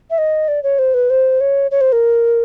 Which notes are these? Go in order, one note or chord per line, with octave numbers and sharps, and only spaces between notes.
E5
D#5
D5
C#5
C5
B4
C5
C#5
C#5
C5
A#4